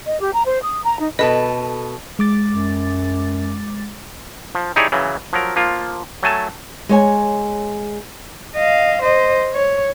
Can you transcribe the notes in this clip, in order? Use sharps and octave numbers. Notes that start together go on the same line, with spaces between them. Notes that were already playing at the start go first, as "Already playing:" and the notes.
D#5
G4
A#5
C5
D#6
A#5
D#4
B2 A4 B4 D#5
G#3 D6 A6
F#2
F3
D#4 E4 G4 G#4 C#5 D5
C#3 E3 F#3
F3 F#3 A#4
F3 A#3 F4
F#3 A3 G#5 A5
G#3 C#5 G#5
D#5 F5
C5 D#5
C#5